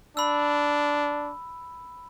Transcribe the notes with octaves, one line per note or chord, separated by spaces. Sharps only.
D4 B5 E6